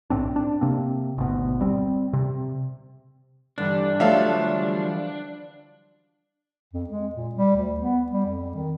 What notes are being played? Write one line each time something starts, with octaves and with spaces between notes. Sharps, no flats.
B1 A2 C4 D4
D4
C3 A#3 C4
G#1 D2 B2
G3 C4
C3
G2 D3 E3 G3 D4
F3 F#3 A3 E5 F5 A5
F2
G#3
A#2
G3
D2
B3
G3
F2
D#3